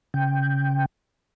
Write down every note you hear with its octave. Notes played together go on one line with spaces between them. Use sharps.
C#3 G5